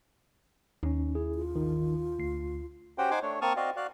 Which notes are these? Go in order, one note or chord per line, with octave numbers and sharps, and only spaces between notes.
D#2 C#4 D#4
E4 G#4
F4
G#1 D#3 D#4
D2 C7
C#4 F#4 G4 C5 F#5 G5
D#4 C5 F#5 G#5 C6 D6
A3 D4 C#5
A#3 C4 A5 C#6 D#6 F6
C4 F#4 D5 D#5 F5
F#4 D5 F5 F#6